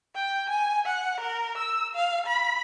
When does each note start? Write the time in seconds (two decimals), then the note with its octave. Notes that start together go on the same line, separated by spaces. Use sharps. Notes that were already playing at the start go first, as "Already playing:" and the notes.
0.15 G5
0.50 G#5
0.86 F#5
1.20 A#4
1.58 E6
1.95 F5
2.27 B5